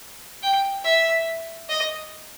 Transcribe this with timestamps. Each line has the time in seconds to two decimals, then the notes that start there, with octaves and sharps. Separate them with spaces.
0.42 G5
0.84 E5
1.69 D#5